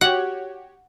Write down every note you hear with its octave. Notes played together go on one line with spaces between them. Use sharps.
F#4 G4 C#5 F#5